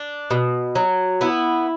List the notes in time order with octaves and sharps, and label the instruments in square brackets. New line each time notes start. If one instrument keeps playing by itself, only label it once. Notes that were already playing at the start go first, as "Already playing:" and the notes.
Already playing: [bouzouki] D4
B2
F#3
B3 E4